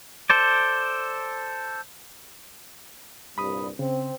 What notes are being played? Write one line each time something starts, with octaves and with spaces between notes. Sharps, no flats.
A4 C5 D5
C2 G2 A#2 B5 D#6
C#3 C4